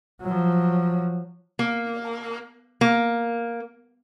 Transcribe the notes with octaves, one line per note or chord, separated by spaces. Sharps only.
F3 F#3
A#3
A#3